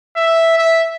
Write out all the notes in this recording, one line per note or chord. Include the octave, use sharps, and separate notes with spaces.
E5
E5